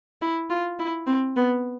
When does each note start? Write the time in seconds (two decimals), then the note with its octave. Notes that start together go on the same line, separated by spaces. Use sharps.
0.22 E4
0.50 F4
0.79 E4
1.07 C4
1.37 B3